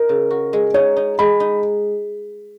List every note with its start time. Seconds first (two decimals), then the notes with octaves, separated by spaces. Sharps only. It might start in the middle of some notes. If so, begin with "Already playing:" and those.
Already playing: D#4 A#4
0.09 C#3
0.30 F#4
0.53 G#3
0.74 D#4 C#5
0.96 D#4
1.19 G#3 B5
1.40 D#4